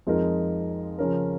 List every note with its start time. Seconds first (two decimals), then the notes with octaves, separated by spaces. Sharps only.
0.07 F2 F3 G#3 D#4 A#4
0.99 C#3 F3 C#4 A#4